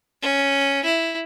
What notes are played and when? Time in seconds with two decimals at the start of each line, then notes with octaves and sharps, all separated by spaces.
0.22 C#4
0.84 E4